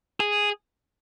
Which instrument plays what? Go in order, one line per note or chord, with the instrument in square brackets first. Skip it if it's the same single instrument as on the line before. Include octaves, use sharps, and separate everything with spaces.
[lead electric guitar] G#4